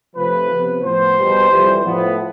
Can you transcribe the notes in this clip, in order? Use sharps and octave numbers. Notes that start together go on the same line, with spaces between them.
C3 F3 A3 B4
C3 F3 B3
A2 F3 B3 C5
E2 B2 G3 B3
F2 E3 G3
A2 F3 B3